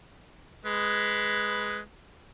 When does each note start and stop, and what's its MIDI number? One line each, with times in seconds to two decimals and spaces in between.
0.65 1.78 56
0.65 1.78 71